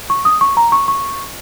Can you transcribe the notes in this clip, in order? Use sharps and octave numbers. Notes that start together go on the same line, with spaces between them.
C#6
D#6
C#6
A#5
C#6
C#6